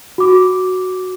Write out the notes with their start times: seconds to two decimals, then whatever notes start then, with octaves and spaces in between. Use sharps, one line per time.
0.18 F#4 D6